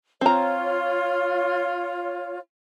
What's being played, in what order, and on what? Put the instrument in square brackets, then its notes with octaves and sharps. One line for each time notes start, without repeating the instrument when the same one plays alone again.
[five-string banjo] C4 A#5 [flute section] F4 C#5